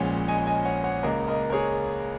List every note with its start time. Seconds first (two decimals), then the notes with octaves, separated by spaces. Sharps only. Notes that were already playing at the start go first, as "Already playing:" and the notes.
Already playing: A#1 A#2 G#3 C#4 C#5 F#5
0.28 D#5 G#5
0.47 D#5 G#5
0.65 C#5 F#5
0.84 C#5 F#5
1.03 C#2 C#3 A#3 A#4 D#5
1.28 A#4 D#5
1.50 A#4
1.52 G#4 C#5